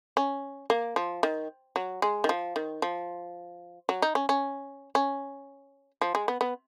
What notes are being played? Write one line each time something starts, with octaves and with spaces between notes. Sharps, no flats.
C#4
A#3
F3
D#3
F#3
G#3
D#3
F3
D#3
F3
F#3
D#4
C#4
C#4
C#4
F3
G#3
B3
B3